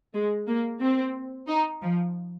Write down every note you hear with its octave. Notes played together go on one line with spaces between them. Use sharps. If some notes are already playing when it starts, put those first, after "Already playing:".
G#3
A#3
C4
D#4
F3